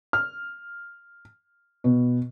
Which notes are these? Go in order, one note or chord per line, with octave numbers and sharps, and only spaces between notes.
F6
B2